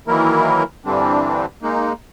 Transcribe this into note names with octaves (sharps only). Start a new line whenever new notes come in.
D#3 E3 F#3 A#3 E4 A#4
G2 D3 E3 G3 C4 D4
G#3 A#3 D#4